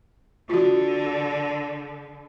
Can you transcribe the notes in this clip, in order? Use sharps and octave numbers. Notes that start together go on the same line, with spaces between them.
D3 F4 F#4